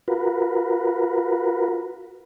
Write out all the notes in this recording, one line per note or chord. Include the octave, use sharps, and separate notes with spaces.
F4 F#4 A#4 B4